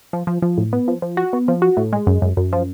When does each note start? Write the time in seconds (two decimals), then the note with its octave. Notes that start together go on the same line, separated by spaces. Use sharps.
0.13 F3
0.27 F3
0.42 F3
0.58 A2
0.73 B3
0.88 F3
1.02 F3
1.17 F#4
1.33 B3
1.48 F3
1.62 F#4
1.77 A2
1.93 G#3
2.07 F#2
2.22 F#2
2.37 F#2
2.53 F3